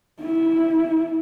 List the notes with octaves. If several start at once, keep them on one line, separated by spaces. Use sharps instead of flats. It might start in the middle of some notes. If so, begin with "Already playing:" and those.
E4